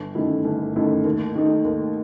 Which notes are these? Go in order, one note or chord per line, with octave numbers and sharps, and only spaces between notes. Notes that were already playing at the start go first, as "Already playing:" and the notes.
Already playing: G1
F#2 D#3 A3 E4
G1
F#2 D#3 A3 E4
D#2
D#3 A3 D#4
D#2